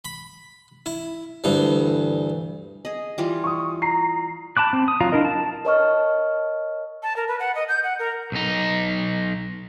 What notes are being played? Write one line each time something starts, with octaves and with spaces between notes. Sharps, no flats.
B5
E4
D2 G2 E3
G#4 D#5
E3 G3 F4
C#6 D#6
A#5 C7
A5 B5 D6 F#6
C4
D#6
F#3 F4 F5 A#5
D4 E4 A#4 D#5
A5
A#4 C#5 D#5 A5 C#6 F6
A5
A#4
B4
F#5
D#5
G6
F#5
A#4
B1 D#4